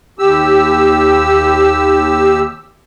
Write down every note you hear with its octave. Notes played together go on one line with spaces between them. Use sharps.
D#2 G4 E6